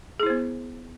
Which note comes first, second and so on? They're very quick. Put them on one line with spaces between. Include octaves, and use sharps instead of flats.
G#4 E4 C5 B3